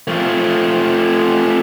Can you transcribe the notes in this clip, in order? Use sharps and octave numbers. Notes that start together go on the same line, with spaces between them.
F3 A3